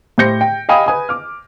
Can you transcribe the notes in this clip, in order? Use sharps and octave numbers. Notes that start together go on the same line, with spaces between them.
A2 G4 C5 G6 A#6 C#7
G5
D#5 F5 G5 G#5 B5 D#6
B4 G#5 D#6
D6 F6